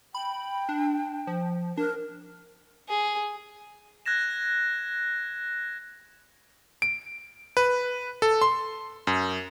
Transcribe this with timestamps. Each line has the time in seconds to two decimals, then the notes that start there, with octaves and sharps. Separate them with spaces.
0.15 G5 B5
0.69 D4
1.27 F3
1.78 D4 A#4
2.89 G#4
4.06 F#6 G#6 A#6 E7
6.82 D7
7.57 B4
8.22 A4
8.42 C6
9.07 F#2